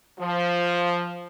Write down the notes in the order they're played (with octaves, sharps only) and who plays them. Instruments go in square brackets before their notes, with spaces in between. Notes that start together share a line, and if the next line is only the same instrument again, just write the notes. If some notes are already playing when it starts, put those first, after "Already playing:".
[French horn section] F3